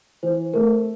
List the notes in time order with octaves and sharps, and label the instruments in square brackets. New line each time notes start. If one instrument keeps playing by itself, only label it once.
[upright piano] E3 [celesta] C5
[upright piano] A3 C4 [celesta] A#4